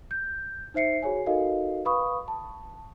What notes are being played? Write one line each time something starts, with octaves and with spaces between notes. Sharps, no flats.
G6
D#4 C5 E5 C7 C#7
F#4 G#4 C#5 G#5
D#4 F#4 A4 A#4 D#5 F5
B4 F5 B5 C#6 D#6
A5